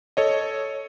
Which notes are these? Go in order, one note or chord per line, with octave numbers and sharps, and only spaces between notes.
A4 C#5 D#5